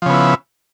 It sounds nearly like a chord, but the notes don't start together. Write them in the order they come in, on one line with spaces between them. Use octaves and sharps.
F3 C#3 B3 E4